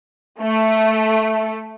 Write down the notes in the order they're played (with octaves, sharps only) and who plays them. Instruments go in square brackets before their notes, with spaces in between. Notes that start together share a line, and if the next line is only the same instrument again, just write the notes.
[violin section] A3